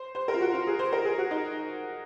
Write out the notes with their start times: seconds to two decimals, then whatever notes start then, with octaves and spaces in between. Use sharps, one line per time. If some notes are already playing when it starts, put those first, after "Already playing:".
Already playing: C5
0.15 C5
0.28 A#4
0.34 F4
0.41 F#4
0.54 F4
0.67 G#4
0.79 C5
0.93 A#4
1.05 G#4
1.18 F#4
1.31 D#4